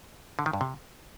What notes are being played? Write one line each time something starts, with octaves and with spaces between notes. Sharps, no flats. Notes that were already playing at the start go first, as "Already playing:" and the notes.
D3
D#3
G2
C3